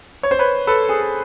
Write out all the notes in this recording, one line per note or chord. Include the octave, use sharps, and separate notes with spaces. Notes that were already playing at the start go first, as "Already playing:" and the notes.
C#5
C5
B4 C#5
A4 B4
G#4
A4